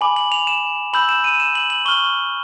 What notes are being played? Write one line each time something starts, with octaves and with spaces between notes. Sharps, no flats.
G#5 B5 D6 F#7
F#7
F7
E7
B5 E6 G6 F#7
E7
D#7
E7
F#7
F#7
C#6 F6 G7